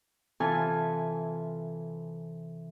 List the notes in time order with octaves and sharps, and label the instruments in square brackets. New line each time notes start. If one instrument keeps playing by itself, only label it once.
[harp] C3 E3 F4 A4 G#5 F6